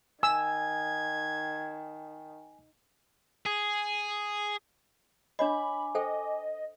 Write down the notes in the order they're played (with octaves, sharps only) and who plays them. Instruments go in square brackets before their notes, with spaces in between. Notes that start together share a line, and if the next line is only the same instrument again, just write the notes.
[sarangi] D#3 [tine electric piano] G#5 [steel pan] E6 [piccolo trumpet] G#6
[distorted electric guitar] G#4
[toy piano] D4 C#5 D#5 [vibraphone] G#5 D6 [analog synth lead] B5
[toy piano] A4 C5 G5 [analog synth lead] D#5